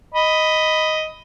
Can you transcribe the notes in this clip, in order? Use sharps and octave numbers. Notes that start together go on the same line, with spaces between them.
D#5 B5